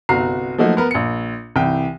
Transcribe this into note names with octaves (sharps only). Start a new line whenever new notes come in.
G1 C2 F#4 A#5 C7
F3 F#3 A3 A#3 D#4 F#4
B3 A#4 B4
A#1 C#7
C2 E3 G5